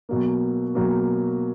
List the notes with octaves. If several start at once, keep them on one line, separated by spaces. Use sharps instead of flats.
B2 F#3 A#3
B2 F#3 A#3